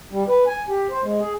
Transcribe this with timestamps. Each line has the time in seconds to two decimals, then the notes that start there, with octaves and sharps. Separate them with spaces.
0.11 G3
0.28 B4
0.47 G#5
0.69 G4
0.90 C5
1.04 G#3
1.20 G#4